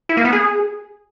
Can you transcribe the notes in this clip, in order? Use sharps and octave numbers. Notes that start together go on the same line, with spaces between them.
E4
A#3
B3
G#4